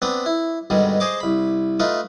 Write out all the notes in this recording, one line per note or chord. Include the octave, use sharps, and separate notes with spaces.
B3 C4 D4 B4
E4
G2 B2 D3 D#3 G3 G#3
G#4 C5 D#5 D6
C2 B5
A3 D#4 F4 B4